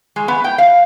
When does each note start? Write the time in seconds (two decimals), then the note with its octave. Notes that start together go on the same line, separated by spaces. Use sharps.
0.16 G#3
0.28 B3
0.44 G5
0.58 F5